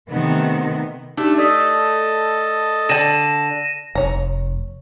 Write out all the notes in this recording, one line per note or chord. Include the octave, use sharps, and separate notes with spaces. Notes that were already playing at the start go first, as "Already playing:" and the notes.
C3 D#3 A3 B3
A3 D4 D#4 G4 E5
A4 D5 D#5 D#6 B6
D3 A5 A#6 D#7 E7
F1 C#5 A#5